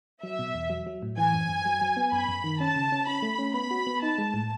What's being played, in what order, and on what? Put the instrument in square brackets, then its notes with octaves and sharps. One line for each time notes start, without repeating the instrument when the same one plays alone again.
[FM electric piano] F#3 [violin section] E5
[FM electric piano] B2
E2
F#3
F#3
A2
[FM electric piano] E3 [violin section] G#5
[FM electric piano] F#2
F#2
F#3
F#3
B3
[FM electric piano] F#2 [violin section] B5
[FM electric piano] F#2
D#3
[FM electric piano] C#4 [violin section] A5
[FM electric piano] C#3
C#4
[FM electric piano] C#4 [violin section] B5
[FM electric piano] A3
C#4
[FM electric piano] B3 [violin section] B5
[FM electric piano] F#4
B3
[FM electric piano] D#4 [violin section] A5
[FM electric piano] G#3
A2